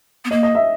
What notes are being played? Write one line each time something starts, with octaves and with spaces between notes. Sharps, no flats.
B3
A#3 D#5
D#5
E5